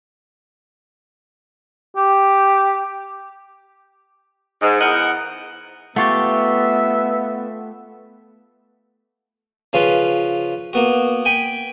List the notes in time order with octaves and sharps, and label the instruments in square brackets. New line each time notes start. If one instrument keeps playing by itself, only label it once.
[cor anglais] G4
[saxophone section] G#2
E2 A#4 D#5 F#5
[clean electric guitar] A3 F4 G4 [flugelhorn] B3 [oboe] E5 [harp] F#5 C#6 A6
[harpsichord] C#3 F3 C#4 F4 B4
A#3 B3 F#4
G5 G#5 B5